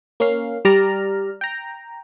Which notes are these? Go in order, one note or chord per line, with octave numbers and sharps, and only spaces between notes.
A#3 C#4 F5
G3 D5 A#5 F6
G5 A#5